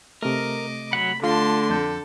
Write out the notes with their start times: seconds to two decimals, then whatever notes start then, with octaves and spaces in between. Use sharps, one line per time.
0.22 C3 A3 A#4 D#5 D6
0.93 F#3 F#5 B5
1.24 D3 A3 F4 A5 C6
1.70 F2 A4 G6